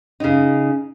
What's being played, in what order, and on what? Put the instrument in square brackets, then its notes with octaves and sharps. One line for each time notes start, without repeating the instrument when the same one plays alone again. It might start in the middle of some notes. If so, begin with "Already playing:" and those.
[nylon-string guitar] C#3 D#4